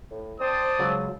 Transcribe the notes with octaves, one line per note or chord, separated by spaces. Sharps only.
A2
C4 C5 D5 A5 D#6
C#2 C#3 F#3